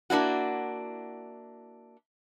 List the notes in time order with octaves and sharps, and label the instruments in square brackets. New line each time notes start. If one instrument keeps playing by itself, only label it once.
[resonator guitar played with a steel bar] A#3 D4 E4 F#4